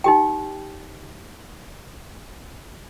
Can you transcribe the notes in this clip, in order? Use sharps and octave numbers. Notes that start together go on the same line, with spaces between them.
D#4 G4 G5